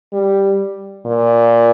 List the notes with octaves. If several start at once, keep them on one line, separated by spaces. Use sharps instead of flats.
G3
A#2